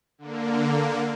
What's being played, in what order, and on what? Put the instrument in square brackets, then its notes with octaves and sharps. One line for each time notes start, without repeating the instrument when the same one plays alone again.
[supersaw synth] D3 A#3